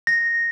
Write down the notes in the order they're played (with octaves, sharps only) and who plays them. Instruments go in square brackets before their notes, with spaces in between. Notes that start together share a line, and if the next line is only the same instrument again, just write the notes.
[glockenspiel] A#6